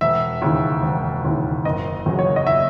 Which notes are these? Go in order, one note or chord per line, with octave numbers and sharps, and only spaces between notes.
E1 E5
D#2 C#3 E3
E1
D#2 C#3 E3
F#1 D#5
E2 C#3 F#3
C#5
D#5
E5